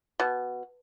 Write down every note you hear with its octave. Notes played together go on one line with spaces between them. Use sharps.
B2